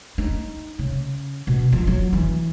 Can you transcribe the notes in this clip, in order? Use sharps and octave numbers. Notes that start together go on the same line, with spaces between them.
D#4
C#3
B2
F3
F#3
E3